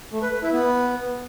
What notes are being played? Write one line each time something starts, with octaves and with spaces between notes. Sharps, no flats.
A3
B4
B4
E4
B3